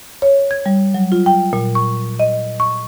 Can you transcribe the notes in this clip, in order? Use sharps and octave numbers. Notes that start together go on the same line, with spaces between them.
C#5
G#6
G3
F#3
F4
G5
A#2
C#6
D#5
C#6